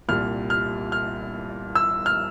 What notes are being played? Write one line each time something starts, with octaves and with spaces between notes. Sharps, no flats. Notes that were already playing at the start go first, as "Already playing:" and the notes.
C2 A#2 G3 F6
F6
F6
E6
F6